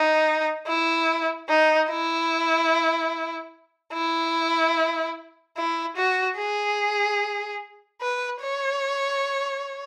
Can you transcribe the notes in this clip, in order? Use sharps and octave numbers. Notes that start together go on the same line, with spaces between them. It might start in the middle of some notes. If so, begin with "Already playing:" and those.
Already playing: D#4
E4
D#4
E4
E4
E4
F#4
G#4
B4
C#5